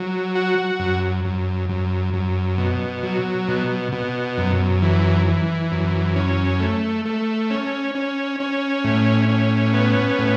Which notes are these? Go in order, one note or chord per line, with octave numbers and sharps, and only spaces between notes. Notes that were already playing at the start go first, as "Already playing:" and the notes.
Already playing: F#3
F#4
F#2
F#2
F#2
F#2
B2
F#3
B2
B2
F#2
E3
E3
F#2
C#4
A3
A3
C#4
C#4
C#4
A2
C#4
B3
A2